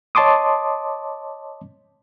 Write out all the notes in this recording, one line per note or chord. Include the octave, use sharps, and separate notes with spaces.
C#5 D#5 A5 C6 D6 D#6